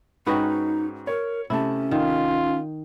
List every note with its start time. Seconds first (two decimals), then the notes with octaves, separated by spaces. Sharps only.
0.27 G#2 C#4 D#4 F#4 B4 D#5 G5
1.07 A#4 C#5
1.50 C3 A3 C#4 E4 A5
1.91 D#3 F4